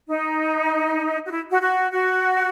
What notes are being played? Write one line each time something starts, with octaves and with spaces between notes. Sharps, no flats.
D#4
F#4
E4
F#4
F#4
F#4